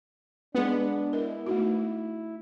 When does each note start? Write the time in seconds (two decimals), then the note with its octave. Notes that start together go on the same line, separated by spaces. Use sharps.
0.55 G#3 B3 D4
1.13 E4 A#4 D#5
1.46 A3 D#4 F#4